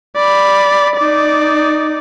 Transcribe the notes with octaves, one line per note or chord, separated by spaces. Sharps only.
D5 B5
D#4 D5